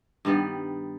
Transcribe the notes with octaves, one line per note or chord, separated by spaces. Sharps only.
G2 D#3 G3 B3